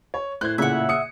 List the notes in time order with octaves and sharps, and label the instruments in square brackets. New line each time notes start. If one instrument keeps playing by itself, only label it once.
[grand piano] C#5
[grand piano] A2 [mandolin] C5 [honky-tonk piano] F#6 G#6
[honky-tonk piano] A#2 C#3 [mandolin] E5 F#5
[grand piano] D#6 C#7